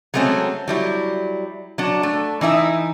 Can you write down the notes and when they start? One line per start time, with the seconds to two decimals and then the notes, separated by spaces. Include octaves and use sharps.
0.14 F#3 G#3 A3 C4 C#4
0.68 F#3 G3 E4
1.78 F#3 D4
2.03 A3
2.41 E3 D#4 E4 E5